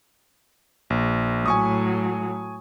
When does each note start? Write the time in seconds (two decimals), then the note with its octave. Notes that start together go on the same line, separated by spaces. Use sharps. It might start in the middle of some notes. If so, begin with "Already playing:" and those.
0.90 A#1
1.46 A2 F#3 G#5 C#6 D#6